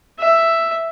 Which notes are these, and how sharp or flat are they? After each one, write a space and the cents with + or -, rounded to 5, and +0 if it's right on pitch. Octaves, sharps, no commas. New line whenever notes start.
E5 +5